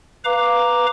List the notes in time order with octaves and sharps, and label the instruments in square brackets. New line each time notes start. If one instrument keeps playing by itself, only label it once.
[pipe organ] B4 F5 A#5 D6